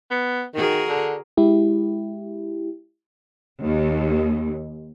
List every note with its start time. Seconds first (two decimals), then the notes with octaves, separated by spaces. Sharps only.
0.11 B3
0.54 D#3 F#4 G#4 A#4
0.89 D3
1.37 G#3 E4 G4
3.63 D#2